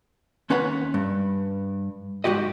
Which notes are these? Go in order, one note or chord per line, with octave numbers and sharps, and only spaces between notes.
D#2 C#4 B4 C#5 F#5 B5
G2
G#2 C#3 F#4 G4 D#5